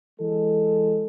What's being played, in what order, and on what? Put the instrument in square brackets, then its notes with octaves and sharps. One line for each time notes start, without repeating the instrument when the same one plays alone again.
[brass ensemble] E3 G#3 A4